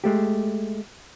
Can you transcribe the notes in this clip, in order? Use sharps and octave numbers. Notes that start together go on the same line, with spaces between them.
G#3 A3 G4